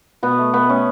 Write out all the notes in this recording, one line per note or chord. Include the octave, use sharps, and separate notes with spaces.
B2 B3
A3
B2 B3
A3 C#4